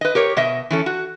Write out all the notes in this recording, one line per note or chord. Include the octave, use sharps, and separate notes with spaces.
B4 D#5
G4 A#4 C#5
B2 D#5 E5
E3 C#4 A4
F#4